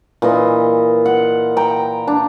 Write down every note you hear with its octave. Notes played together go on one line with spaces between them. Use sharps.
A#2 E3 D#5
F#5
G5 A#5
D4